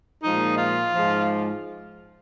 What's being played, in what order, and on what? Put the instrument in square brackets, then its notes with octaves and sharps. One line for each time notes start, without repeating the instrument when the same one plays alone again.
[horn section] A#2 F3 G#3 D#4
F4
G#2 F3 G#3